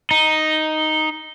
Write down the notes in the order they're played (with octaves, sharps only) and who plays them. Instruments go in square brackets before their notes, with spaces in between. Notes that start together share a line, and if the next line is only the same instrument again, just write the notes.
[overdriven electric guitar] D#4